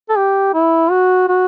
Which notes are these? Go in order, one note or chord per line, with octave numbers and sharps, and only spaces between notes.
A4
G4
E4
F#4
F#4